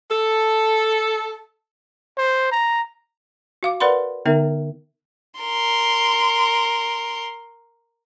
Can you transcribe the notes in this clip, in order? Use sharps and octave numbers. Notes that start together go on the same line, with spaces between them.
A4
C5
A#5
F#4 F5 D6
A#4 B4 D5 F#5 B5 C6
D3 B3 D#4 A#4 E5
A#4 C6